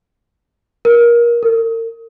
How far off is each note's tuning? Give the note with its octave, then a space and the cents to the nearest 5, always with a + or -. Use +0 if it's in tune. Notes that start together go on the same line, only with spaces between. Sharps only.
A#4 +20
A#4 -40